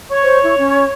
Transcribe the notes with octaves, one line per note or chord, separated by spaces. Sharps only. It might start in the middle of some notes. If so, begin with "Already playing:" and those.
C#5 C#6
C5
E4
C#4